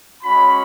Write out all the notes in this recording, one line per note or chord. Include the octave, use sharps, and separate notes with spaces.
G#3 C#4 F#4 B5